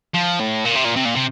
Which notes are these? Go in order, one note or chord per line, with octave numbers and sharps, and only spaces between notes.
F3
A2
A#2
C3
A#2
C3
A#2
C3